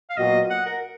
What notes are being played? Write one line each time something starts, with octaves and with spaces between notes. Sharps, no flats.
F5
A#2 F#3 B3 F#4 D#5
F#5
A#4